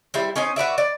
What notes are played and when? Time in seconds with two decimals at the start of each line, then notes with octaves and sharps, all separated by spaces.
0.14 G3 E4 C5
0.36 C#4 D#4 C5 G#5
0.56 F#4 B4 D5 E5
0.78 D5